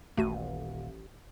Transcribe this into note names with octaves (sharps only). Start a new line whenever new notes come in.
D#1 A1 A3 F#4 D#7